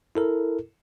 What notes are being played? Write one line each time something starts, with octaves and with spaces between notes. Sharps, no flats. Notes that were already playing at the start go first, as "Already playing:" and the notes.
E4 A4 A#4